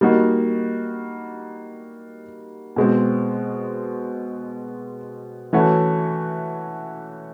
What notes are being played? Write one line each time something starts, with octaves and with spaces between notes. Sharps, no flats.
G3 A#3 D#4 F#4
B2 G#3 C4
E3 A3 C#4 F#4